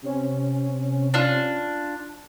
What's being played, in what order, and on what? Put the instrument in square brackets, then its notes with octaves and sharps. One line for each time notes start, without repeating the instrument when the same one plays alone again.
[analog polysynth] C3 C#4
[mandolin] D4 F4